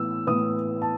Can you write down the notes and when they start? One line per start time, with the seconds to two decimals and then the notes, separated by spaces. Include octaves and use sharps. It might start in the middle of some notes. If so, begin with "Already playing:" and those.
Already playing: A2 E3 B3 E6
0.27 A2 E3 B3 D#6
0.82 A5